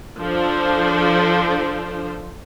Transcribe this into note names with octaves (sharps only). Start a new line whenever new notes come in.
F3 D4 A4 C5